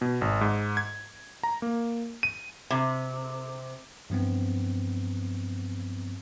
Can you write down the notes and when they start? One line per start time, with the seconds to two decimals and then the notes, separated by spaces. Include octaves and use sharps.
0.01 B2
0.21 G#1
0.41 G#2
0.77 G#6
1.43 A#5
1.62 A#3
2.23 D#7
2.71 C3
4.10 G2 F3 B3 C4